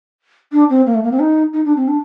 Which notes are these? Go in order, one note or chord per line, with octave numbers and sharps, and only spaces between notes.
D4
C4
A#3
A3
A#3
C4
D#4
D#4
D4
C4
D4